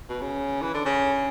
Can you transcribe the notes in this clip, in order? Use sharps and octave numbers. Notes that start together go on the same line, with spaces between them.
B2
C#3
E3
D3
C#3